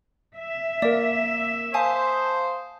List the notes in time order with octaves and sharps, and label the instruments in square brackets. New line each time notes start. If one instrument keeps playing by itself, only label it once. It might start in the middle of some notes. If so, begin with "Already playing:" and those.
[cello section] E5
[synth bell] A#3 A#4 [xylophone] D5
[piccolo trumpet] C5 [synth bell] F5 A5 D#6 [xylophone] G#5